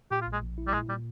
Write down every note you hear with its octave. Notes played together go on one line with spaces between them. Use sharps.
A#2 G4
F4
A#1
G#3
A#1
E4
G3
A#2 G#3
A#2 G3